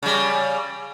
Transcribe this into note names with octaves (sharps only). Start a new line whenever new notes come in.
C#3 G3